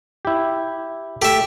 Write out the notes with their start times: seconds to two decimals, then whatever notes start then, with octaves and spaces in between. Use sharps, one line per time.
0.25 E4 G4
1.22 A3 G4 A4 E5